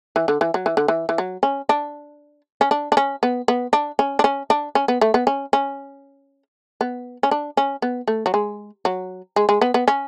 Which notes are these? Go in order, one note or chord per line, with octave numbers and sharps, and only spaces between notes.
E3
D3
E3
F#3
E3
D3
E3
E3
F#3
C#4
D4
C#4
D4
D4
C#4
B3
B3
D4
C#4
D4
C#4
D4
C#4
B3
A3
B3
C#4
C#4
B3
C#4
D4
C#4
B3
A3
F#3
G#3
F#3
G#3
G#3
B3
B3
C#4